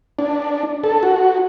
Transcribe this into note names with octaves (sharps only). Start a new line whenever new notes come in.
D4
A4
F#4